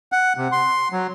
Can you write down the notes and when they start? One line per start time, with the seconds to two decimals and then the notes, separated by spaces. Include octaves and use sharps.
0.12 F#5
0.37 C3
0.52 C6
0.92 F#3